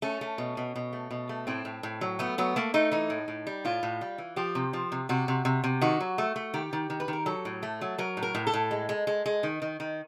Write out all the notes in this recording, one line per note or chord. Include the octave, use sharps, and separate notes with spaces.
A3 C#4
A3
B2
B2
B2
A3
B2
A3
A2 C4
A2
A2
F#3
A3 B3
F#3 B3
A3 A#3
A3 D#4
E3 D#4
A2
A2
G3
A2 F4
A2
G3
E3
F3 G4
C3
F3
C3
C3 F#4
C3
C3
C3
D#3 F#4
F#3
A3
A3
D#3 G4
D#3
D#3
B4
D#3
A#4
F#3 A4
A2
A3
F#3
F#3 A#4
A2
A#4
A2
A4
A2
G#3
G#3
G#3
G#3
D#3
D#3
D#3